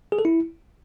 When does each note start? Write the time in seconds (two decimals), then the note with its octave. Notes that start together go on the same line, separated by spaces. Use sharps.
0.12 G#4
0.19 A4
0.25 E4